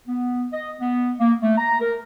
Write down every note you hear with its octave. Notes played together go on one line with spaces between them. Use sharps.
B3
D#5
B3
A#3
A3
A#5
A#4